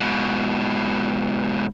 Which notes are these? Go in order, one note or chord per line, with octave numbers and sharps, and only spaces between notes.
G#2 B2